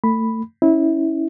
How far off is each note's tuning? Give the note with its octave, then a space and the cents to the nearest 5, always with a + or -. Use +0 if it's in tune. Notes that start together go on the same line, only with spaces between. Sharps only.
A3 +30 B5 +0
C#4 +0 E4 -20